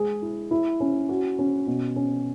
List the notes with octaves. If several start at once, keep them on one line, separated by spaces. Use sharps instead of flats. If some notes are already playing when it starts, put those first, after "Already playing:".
Already playing: G#3 G#4
E4
E4
C#4
F#4
C#4
B2
C#4